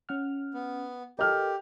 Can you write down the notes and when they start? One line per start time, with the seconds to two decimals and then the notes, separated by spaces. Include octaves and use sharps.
0.09 C#4 F#5 F6
0.54 B3
1.19 G4 A4 A#4 D#5 F6